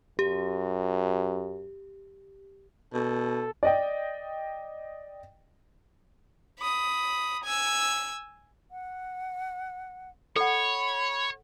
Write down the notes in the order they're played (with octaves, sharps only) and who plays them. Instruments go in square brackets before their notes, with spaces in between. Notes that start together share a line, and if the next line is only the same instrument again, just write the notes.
[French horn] F#2 [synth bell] G4
[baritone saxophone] B2 [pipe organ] A4
[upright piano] D5 D#5 G5
[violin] B5 D#6
G#5 E6
[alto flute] F#5
[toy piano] A4 F#5 [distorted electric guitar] C#5 [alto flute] B5